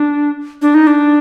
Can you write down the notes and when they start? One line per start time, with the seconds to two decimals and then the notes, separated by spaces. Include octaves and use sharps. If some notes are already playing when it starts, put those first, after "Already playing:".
Already playing: D4
0.62 D4
0.74 D#4
0.87 D4